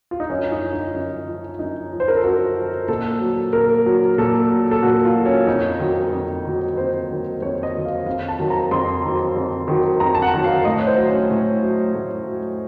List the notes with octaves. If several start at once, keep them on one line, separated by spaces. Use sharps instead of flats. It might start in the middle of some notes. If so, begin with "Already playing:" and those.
F4
D#4
F#2 C#4
D#4
F3
D#4
F#2
F3
F#2 D#4
F3
C5
A#4
A4
F#2 F#4
F3
A#2 A4
F#3
A#2 A#4
F#3
A#2 A4
F#3
A4
A#2 F#4
F4
F#3
C#4
F2 D#4
D#3 F#3
F2
D#3 F#3
F2 C5
D#3 F#3
F2 C#5
D#5
D#3 F#3
F5
F2 F5
A5
D#3 F#3
A#5
F2 C6
D#3 F#3
F2
D#3 F#3
F2 A#5
A5
F#5
D#3 F#3
F5
A2 D#5
C#5
C5
F#3
C#4
A2
F#3
A2
F#3